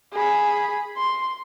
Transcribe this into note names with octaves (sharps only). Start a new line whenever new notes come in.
G#4 B5
C6